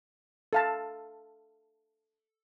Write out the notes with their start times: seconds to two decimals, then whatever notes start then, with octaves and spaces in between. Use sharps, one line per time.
0.53 A4 F5 A5